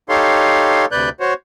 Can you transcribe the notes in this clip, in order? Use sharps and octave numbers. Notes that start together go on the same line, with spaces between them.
D#4 G4 A4 C#5 F5 C6
D2 C3 B4 D5 F#6 G6
F#4 C5 C#5